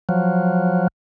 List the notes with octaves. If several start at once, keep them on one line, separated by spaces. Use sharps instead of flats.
F3 F#3